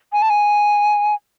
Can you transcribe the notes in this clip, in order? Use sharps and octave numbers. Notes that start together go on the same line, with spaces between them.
G#5
A5
G#5